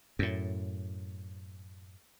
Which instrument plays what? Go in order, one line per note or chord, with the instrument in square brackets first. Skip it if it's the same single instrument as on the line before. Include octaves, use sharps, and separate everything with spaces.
[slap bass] F#2 A2